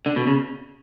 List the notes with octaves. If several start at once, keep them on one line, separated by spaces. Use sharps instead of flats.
D3
B2
C#3